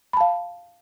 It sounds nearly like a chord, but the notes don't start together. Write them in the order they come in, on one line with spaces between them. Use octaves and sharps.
B5 A5 F5